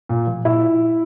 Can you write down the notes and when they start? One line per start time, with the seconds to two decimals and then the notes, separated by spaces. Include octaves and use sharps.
0.09 A#2
0.27 F3
0.45 A#2 E4